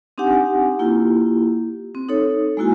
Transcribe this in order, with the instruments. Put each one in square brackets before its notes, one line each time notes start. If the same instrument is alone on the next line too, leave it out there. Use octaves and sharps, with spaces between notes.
[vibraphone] C4 D4 D#4 G4 F#5 G#5
A#3 E4 F4 G4
C4
D#4 A4 C#5
G#3 A#3 E4 F#4 G#5